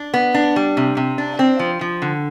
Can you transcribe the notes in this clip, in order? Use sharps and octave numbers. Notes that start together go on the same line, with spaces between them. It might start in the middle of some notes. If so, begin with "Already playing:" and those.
Already playing: D4
B3
D4
G3
C3
C3
D4
C4
F3
F3
D3